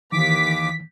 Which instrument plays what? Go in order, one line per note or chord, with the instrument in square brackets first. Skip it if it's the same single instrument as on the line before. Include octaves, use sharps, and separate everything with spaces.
[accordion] D#2 D6 [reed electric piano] D#3 E3 [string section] B6